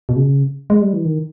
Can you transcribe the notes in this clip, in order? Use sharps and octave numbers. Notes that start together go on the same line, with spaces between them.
B2
C#3
G#3
G3
E3
D#3